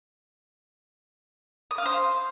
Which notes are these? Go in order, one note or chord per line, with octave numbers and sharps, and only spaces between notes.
D#6
F5
C5